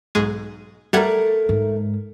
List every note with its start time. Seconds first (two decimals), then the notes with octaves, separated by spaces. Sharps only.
0.15 B1 G#2 G#3
0.93 G3 A3 A#4 F#5 G#6
1.49 G#2